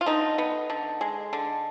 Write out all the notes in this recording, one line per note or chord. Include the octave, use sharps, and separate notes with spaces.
F4
D3 D#4
B3
D3
G#3
D3